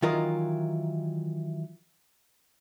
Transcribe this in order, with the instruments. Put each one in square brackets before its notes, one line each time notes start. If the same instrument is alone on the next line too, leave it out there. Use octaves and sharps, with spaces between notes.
[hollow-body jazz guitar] D#3 E3 F#3 F4 A#4 D#5